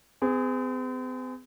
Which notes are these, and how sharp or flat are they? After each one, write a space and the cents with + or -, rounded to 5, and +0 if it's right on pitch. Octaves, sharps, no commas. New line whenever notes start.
C4 -45 G#4 -10